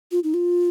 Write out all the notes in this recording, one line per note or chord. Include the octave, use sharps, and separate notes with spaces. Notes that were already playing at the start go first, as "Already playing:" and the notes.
F4
D#4
F4